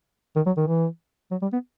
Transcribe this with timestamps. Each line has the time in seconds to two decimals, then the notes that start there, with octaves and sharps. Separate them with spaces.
0.36 D#3
0.46 F#3
0.57 D#3
0.67 E3
1.31 F#3
1.42 G3
1.53 B3